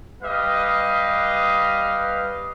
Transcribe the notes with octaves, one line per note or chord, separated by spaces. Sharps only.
G3 B4 D#5 F5